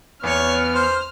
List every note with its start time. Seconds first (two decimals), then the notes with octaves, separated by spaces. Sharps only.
0.24 E2 B3 C#5 C#6 F6
0.74 C5